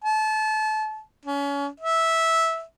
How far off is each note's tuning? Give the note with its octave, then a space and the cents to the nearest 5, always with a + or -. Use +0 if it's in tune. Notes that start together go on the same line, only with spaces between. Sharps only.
A5 -30
C#4 +30
E5 -10